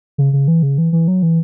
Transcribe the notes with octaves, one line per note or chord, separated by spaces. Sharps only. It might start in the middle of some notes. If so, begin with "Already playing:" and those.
C#3
C#3
E3
C#3
E3
E3
F#3
E3